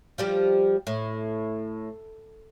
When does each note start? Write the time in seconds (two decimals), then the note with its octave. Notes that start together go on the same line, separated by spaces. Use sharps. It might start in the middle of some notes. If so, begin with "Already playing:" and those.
0.18 F3 G3 G4
0.87 A2